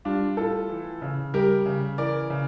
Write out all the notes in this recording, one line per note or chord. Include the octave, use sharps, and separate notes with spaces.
G3 D4 F4
A2 F4 A4
E3
C#3
G3 G4 A#4
C#3
E3 A#4 D5
C#3